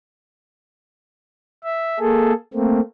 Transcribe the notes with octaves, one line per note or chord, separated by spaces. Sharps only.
E5
A#3 G#4 A4
A3 A#3 C4